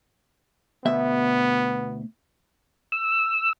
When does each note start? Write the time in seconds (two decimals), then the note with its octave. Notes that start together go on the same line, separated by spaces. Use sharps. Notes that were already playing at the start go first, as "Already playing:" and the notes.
0.85 D2 B2 B3 E5
2.92 E6